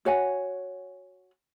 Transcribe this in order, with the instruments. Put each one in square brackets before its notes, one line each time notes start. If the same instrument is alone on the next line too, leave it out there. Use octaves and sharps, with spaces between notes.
[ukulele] F#4 C#5 F#5 G#5